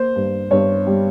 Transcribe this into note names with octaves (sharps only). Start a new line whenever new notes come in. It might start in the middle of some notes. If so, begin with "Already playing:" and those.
Already playing: A#3 C5
G2
G2 C#5
G3